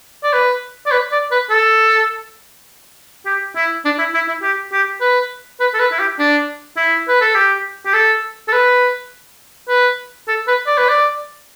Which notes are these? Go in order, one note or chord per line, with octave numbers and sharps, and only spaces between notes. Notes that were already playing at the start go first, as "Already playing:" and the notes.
D5
B4
D5
B4
D5
B4
A4
G4
E4
D4
E4
E4
E4
G4
G4
B4
B4
A4
B4
E4
G4
D4
E4
B4
A4
G4
G4
A4
A4
B4
B4
A4
B4
D5
B4
D5